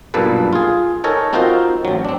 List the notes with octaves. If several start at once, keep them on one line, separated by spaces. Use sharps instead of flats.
B1 G2 A#2 A#3 A4 B4
F4 G#4
D#4 A4 A#4 C#5 G#5 A#5
C4 D#4 F4 F#4 A#4 C5
A1 F#3
C4 D4